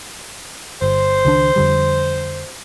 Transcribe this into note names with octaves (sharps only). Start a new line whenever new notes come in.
G1 C5
C#2 D#3 D4
F2 D3 G3